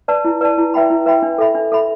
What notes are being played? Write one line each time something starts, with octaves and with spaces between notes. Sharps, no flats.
B4 D5 A5
E4
B4 D5 A5
E4
B4 E5 G5 B5
E4
B4 E5 G5 B5
D4
A4 E5 B5
D4
A4 E5 B5